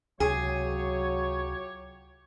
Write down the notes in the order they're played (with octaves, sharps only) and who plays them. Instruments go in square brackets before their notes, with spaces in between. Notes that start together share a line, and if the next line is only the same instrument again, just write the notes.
[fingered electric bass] C#2 C3 [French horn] F#3 [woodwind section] F4 G4 C#5 [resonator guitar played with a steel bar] G#4